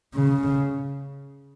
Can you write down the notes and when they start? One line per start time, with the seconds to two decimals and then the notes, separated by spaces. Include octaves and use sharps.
0.15 C#3